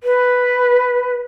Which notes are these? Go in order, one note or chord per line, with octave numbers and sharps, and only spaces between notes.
B4